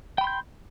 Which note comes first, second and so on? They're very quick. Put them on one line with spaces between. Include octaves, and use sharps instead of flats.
G5 B5 C6 G6